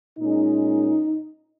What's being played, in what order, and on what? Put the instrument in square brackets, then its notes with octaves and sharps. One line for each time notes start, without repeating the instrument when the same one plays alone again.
[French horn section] A#2 G#3 C#4 D#4